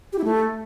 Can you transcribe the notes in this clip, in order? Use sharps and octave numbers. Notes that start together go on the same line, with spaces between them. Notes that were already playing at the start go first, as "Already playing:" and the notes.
G4
E4
A3